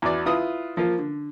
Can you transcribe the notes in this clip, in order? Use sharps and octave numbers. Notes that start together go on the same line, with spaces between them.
E2 F#4 D5
E4 F4 B4 D#6
F3 A#3 F4
D3